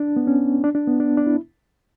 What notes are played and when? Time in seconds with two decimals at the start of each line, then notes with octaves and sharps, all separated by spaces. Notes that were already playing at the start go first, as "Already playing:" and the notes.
Already playing: D4
0.16 B3
0.27 C#4
0.64 D4
0.75 D4
0.87 B3
1.00 D4
1.17 D4
1.26 E4